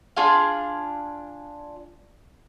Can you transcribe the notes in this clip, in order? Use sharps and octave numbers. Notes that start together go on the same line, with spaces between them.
D4 F4 G#4 F5